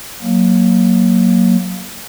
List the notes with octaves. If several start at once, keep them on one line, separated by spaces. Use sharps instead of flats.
F#3 A#3